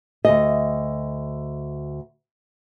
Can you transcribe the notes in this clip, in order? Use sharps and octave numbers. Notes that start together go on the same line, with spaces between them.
D2 G2 D#5